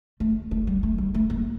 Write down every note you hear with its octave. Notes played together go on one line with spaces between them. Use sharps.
A3
A3
G3
A3
G3
A3
A#3